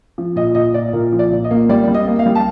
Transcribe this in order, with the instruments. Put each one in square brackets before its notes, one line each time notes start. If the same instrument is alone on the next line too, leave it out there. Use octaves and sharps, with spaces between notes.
[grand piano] F3
A#2 D#5
A#2 D#5
A#2 D5
A#2 A#4
F3
D5
A#2
D#5
A#3
G3 D5
G3
D#5
A#3
F5
G3
A5